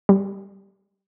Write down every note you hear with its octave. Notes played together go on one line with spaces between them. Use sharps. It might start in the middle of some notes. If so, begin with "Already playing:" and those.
G3